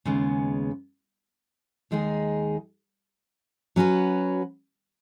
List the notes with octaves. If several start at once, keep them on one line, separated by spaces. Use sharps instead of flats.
D#2 C#3 G#3 B3
D#2 D#3 G#3 D#4 G#4
F#3 C#4 F#4 B4